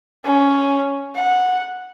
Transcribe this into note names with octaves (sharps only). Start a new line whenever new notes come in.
C#4
F#5